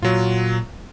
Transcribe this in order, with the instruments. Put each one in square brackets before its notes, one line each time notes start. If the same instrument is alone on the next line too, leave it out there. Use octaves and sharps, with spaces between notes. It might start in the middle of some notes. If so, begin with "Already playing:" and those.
[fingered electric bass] A#2 [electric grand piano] F#3 F4